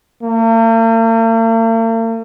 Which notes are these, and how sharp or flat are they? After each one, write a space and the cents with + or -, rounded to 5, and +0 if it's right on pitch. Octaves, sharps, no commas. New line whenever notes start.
A#3 -45